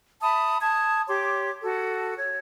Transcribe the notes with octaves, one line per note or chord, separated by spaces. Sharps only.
E5 A5 B5 D#6
A5 D#6 G#6
G4 C#5 C6 D6
F#4 A4
C#5